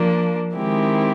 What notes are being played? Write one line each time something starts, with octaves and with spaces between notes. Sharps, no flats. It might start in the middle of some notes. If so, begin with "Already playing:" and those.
Already playing: F3 A#3 D4
D#3 G#3 C4 E4 G4